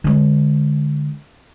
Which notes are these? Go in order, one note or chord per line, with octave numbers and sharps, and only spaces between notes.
D3 G#3